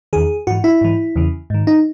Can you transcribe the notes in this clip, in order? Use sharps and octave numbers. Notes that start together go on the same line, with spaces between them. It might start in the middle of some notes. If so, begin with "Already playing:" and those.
E2 D#3 G#4
G#2 E3 F#4
E4
G#2 E3
E2 C#3 E3
G#2 D#3
D#4